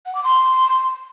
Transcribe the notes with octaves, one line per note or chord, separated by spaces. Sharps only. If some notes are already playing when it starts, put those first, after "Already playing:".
F#5
D6
C6